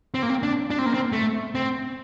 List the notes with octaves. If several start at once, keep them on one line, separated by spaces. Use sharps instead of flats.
C4
A#3
C4
D4
D4
C4
A#3
C4
A3
C4